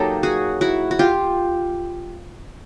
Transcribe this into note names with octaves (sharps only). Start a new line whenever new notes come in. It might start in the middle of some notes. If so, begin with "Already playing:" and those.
Already playing: F#3 A#3 D#4 G4 A4
F#4 G#4
E4 F#4
F#4
F4 G4